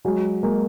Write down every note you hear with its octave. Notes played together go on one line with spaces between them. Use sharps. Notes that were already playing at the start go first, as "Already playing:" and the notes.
F#3 G#3
G#3 A#3